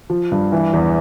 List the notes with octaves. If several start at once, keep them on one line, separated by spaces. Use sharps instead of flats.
F3
G2
E3
E2